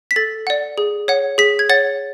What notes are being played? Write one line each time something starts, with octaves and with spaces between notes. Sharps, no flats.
B6
A4 A6
D5 F#5
G#4
C#5 F#5
G#4 B6
G#6
C#5 F#5 A6